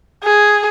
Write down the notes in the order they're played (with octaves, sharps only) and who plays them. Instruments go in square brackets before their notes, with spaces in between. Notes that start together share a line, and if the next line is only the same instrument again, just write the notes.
[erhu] G#4